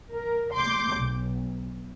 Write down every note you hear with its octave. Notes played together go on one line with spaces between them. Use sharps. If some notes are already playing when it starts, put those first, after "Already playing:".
A#4
C6 D6 G6
B1